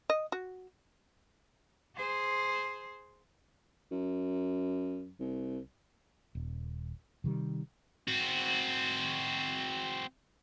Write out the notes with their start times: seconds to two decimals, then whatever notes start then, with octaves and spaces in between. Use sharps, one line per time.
0.10 D#5
0.32 F#4
1.96 G#4 C5
3.91 F#2
5.20 C2
6.35 D#1
7.24 C3 D#3 F#3 G3
8.08 C4 F#4